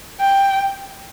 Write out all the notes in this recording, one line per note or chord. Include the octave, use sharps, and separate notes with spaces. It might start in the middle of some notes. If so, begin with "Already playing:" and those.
G5